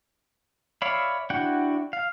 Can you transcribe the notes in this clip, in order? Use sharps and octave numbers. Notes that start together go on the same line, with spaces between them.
C#5 D5 E5 F5 B5
D4 E4 F#4 F#5 G5
F5